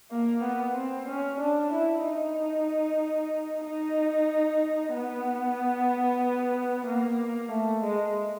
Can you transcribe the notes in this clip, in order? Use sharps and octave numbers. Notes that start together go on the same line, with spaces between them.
A#3
B3
C4
C#4
D4
E4
D#4
D#4
B3
A#3
A3
G#3